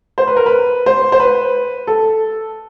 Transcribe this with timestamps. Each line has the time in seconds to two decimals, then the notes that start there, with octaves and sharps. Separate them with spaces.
0.18 C5
0.27 B4
0.36 A#4
0.46 B4
0.86 C5
1.12 C5
1.20 B4
1.87 A4